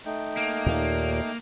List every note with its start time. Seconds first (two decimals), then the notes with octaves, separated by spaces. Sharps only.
0.06 A3 D#4 G5
0.37 A#3
0.66 D#2 A#2